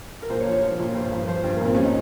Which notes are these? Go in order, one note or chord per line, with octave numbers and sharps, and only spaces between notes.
A#4
A#2 C5
C#5
F3
C#5
F3
A#2
G2 C5
F3
F3 C5
G2
A#3
A#2 C4
G3 C#4
D#4